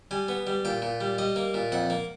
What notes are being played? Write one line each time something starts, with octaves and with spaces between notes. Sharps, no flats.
G3 G#5
B3
G3
A#2 G5
A#2
G3
G3 D#5
A#3
A#2
F2 F#5
A#3